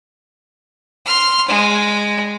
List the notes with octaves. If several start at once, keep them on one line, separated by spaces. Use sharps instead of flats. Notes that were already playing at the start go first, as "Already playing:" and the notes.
C6 F6
G#3